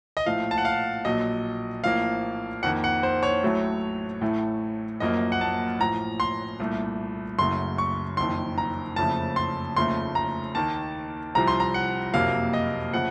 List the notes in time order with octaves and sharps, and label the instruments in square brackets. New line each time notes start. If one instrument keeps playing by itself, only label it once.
[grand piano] D#5
A#1 A2 F3 A3 F5
A5
F#5
F5
A#1 A#2 F#3 D#5
A#1 A2 F3 A#3 F5
F2 D#3 A#3 F#5
F#5
C5
C#5
A1 A2 F#3 A3
A1 A2 A3
F#1 F#2 F3 A#3 D#5
F#5
A5
A1 A2 F3 A#5
C6
C2 A#2 A3
F#1 F#2 C#3 A3 C6
C#6
F#1 F2 D#3 C6
A#5
F#1 F2 C#3 F3 A3 A5
C6
F1 D#2 C#3 F3 A3 C6
A#5
D#2 D#3 A#3 A5
C2 C3 F3 A#5
C6
A#5
F#5
F#1 F2 C3 F#3 A#3 F5
D#5
C#3 F3 A3 F#5